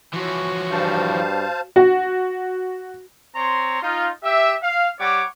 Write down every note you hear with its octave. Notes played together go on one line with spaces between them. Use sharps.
E3 F3 F#4 C#5
G2 C5 F5 A5
F#4
C4 C#5 A#5 C6
D#4 F4
G4 E5
F5
G3 C#5 D5 F#5 D6